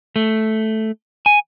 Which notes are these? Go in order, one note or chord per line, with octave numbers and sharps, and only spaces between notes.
A3
G#5